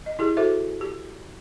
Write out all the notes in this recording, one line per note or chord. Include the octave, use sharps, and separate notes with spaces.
D#5
E4 G4 G#4
F#4 A4 C5 E5
G4